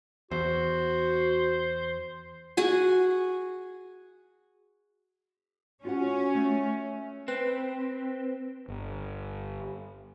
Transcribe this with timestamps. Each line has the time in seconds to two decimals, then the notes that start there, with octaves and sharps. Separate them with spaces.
0.31 E2 F#4 C5
2.57 F#4 G#4 G#5
5.85 C#4 F4 F#4 F#5
6.35 A3
7.28 C4 B4 G5
8.68 G1